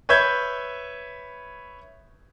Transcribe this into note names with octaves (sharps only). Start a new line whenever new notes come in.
B4 C#5 E5 G6 G#6